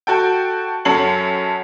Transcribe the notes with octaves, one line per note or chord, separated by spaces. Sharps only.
F#4 A4 G5
F#2 F#3 A4 C#5 C7 F#7